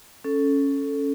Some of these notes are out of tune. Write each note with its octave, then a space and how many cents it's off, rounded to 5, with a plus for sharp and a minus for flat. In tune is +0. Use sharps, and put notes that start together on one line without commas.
C#4 +0 A4 +0